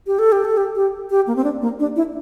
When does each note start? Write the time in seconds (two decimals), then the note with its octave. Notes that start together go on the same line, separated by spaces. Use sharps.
0.07 G4
0.19 A4
0.32 G4
0.45 A4
0.57 G4
0.76 G4
1.10 G4
1.27 A#3
1.36 C4
1.44 D4
1.62 A#3
1.80 D4
1.96 E4